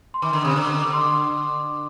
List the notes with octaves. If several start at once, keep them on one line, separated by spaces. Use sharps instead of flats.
C6
D#3 D6
D3
C3 D#6
D3
D6
D6
C6
D6